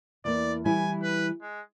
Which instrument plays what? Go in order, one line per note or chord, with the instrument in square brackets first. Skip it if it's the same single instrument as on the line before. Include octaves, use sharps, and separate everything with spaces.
[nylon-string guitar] E2 A#3 [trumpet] D5
[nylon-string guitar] E3 G3 E4 [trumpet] G#5
[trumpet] B4
G#3